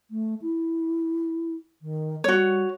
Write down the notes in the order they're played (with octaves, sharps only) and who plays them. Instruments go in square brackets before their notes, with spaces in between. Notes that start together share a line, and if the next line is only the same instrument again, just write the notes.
[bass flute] A3
E4
D#3
[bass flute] G3 [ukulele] F#4 C#5